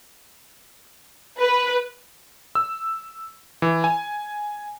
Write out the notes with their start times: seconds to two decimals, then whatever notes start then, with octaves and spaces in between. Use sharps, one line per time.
1.39 B4
2.55 E6
3.62 E3
3.84 G#5